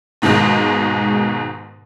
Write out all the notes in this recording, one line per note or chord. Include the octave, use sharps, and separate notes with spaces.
D#2 G#2 B2 D#3 G#3